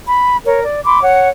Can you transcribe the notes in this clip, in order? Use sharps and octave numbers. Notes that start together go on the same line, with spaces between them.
B5
A#4 C#5
D5
B5 C6 D6
C#5 F#5